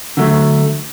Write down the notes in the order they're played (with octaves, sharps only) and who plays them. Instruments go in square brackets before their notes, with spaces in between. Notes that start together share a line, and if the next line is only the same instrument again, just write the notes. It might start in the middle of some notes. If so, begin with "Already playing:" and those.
[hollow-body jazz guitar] D3 F#3 A3